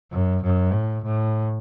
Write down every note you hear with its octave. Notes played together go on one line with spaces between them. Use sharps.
F#2
F#2
A2
A2